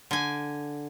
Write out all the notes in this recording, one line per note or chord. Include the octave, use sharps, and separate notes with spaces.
D3 G#5